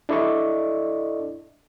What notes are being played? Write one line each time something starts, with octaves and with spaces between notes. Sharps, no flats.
D4 E4 A4 D5 D#5 C#6